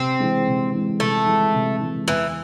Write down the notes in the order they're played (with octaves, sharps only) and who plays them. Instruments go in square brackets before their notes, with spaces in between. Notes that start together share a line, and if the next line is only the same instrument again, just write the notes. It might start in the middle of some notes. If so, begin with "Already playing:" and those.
Already playing: [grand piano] C3 [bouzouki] C4
[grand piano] E3 G#3
C3
E3 G#3
[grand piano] C3 [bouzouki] A3
[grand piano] E3 G#3
C3
E3 G#3
[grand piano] E2 [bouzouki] E3